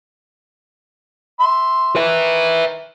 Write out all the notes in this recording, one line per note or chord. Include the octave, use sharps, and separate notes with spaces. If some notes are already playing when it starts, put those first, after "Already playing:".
E5 C6
D#3 B4 E5